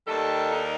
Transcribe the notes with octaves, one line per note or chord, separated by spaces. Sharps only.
D#2 D#3 G3 A4
D#4